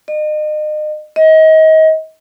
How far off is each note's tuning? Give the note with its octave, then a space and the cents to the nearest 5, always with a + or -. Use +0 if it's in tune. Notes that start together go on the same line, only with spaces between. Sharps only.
D#5 -35
D#5 +30